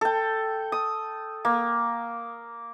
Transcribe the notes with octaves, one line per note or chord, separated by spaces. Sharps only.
A4 G5
D#6
A#3